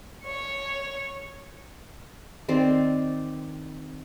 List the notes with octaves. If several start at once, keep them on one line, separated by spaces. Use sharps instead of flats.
C#5 C#6
D#3 C4 D5 C6